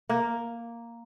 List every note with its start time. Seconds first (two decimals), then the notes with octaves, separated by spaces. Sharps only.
0.09 A#3